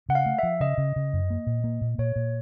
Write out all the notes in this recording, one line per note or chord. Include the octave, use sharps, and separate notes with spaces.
C#3 F#5
F5
A3
F3 E5
C#3 D#5
C#3
C#3
F#2
A#3
A#2
A#3
A#2
A#2 C#5
A#2